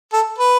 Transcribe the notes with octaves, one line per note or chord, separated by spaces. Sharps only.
A4
B4